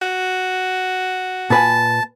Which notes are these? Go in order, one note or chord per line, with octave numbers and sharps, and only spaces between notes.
F#4
A#2 B4 G#5 A5